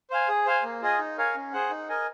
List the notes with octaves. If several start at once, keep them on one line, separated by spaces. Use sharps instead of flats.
C5 F5 G#5
G#4
C5 F5 G#5
A#3
F4 G#4 D#5 G#5
D#4
A#4 C#5 F5 G#5
C#4
G#4 C5 F#5
D#4
A#4 D#5 G#5